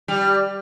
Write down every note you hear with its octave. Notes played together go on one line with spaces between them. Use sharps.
G3